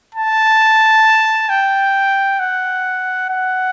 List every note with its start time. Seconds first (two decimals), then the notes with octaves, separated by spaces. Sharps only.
0.15 A5
1.49 G5
2.39 F#5
3.29 F#5